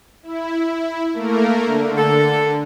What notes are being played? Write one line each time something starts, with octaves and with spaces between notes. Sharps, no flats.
E4
A3 A#3 A#4
D3
A4